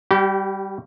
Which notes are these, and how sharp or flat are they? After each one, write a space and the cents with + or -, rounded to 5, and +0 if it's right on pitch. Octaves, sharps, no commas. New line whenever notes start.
G3 +0 G4 -35